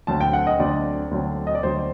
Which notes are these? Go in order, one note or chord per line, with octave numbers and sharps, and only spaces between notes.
D2 D3 F#3 C4 A5
G5
F#5
D#5
D2 D3 F#3 C4 D5
D2 D3 F#3 C4
D#5
D5
D2 D3 F#3 C4 C5